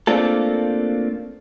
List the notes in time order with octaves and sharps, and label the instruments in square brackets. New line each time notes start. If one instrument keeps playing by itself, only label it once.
[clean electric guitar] A3 A#3 C4 D4 F4 A4